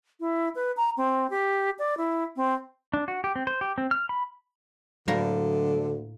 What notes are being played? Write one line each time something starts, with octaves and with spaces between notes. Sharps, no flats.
E4
B4
A#5
C4
G4
D5
E4
C4
D4
F#4
G4
C4
C5
G4
C4
F6
B5
D2 A2 D3 F#3 A#3 D4 A#5